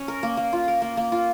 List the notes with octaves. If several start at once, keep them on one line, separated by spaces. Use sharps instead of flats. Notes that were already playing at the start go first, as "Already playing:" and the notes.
Already playing: C#4
A#4
A#3
A#3
F4
A#4
A#3
A#3
F4